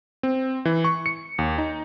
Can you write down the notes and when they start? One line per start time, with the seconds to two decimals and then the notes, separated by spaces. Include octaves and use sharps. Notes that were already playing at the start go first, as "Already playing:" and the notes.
0.23 C4
0.65 E3
0.84 C#6
1.06 C#7
1.39 D#2
1.58 D#4